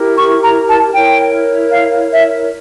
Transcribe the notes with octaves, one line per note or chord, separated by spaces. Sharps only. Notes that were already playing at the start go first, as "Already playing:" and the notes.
Already playing: E4 G4 A#4
C#6
A#5
A5
E4 A#4 C#5 G5
F5
E5